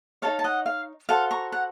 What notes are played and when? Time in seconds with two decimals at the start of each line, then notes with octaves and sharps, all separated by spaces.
0.22 D#4 A4 C#5 F5 A5
0.39 A5
0.44 D#5 F#5
0.66 F5
1.09 F#4 A4 C5 F5 A5
1.31 A#5 C#6
1.52 F#5 A#5